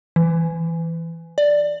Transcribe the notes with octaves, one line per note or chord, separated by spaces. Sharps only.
E3
D5